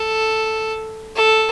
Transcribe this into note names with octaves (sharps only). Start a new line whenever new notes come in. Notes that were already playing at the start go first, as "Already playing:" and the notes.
Already playing: A4
A4